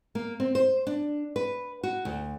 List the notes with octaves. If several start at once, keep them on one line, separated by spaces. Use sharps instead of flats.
A#3
C4
C5
D4
B4
F#4
D2